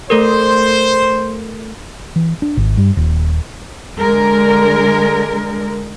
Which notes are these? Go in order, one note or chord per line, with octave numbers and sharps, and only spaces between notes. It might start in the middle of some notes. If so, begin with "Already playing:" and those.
A3 A4 A#4 C5
E3
D4
G#1
G2
D#1
D3 G#3 A#4